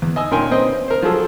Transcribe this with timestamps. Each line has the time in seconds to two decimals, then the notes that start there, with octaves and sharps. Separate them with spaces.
0.02 E2
0.16 D#5 G#5 E6
0.31 A#2 C#4 A#4 G5 G#5 C6
0.51 C4 B4 C5 D#5
0.88 A#4 C5
1.02 F3 F#3 G#4 A4